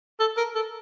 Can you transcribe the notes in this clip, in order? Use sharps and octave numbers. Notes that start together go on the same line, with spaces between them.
A4
A#4
A4